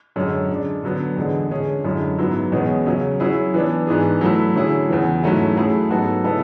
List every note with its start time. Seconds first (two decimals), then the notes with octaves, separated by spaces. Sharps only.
0.16 F#2 D3 G#3 C#4
0.49 D3 G#3 D4
0.83 D3 F#3 B3
1.17 E2 D3 G#3 D4
1.51 D3 G#3 C#4 G#4
1.85 F#2 D3 G#3 C#4 E4
2.18 G#2 F#3 B3 E4
2.52 E2 B2 G#3 C#4 G#4
2.86 C#3 F#3 C#4
3.20 F#3 C#4 E4 G#4
3.54 E3 B3 D4
3.87 G#2 E3 B3 D4 G#4
4.21 F#3 A3 E4
4.55 D3 F#3 C#4 E4 G#4
4.89 E2 C#3 E3
5.23 G#2 F#3 A3 C#4 E4
5.56 F#3 A3 E4 G#4
5.91 G#2 F#3 B3 F#4 A4
6.24 C#3 G#3 B3 E4 A4